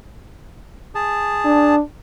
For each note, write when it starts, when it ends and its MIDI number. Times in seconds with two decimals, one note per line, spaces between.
0.95 1.75 68
0.95 1.75 81
1.45 1.81 62